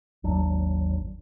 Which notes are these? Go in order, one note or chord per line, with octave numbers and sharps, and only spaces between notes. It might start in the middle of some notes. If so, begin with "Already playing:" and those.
G#1 D#2 F#3 D4